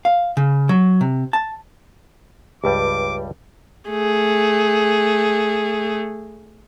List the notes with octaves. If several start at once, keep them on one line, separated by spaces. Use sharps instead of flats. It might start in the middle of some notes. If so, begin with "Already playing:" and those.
F5
C#3
F#3
C3
A5
C#2 G2 G3 G4 B4 D6
A3 G#4